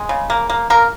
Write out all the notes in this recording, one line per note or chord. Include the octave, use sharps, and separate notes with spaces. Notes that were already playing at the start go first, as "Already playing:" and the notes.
Already playing: G#3
C#3
A#3
A#3
A#3 A#4